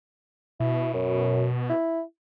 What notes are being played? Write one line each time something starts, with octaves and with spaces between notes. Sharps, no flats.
B2 E4
F#2
E4